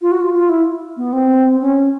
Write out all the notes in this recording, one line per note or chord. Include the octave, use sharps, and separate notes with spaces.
F4
F#4
F4
F4
E4
B3
C4
C#4